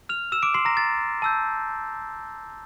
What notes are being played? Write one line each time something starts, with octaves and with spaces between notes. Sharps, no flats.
F6 F7
E6 E7
D6 D7
C6 C7
A#5 A#6
A6
A5 E6 G6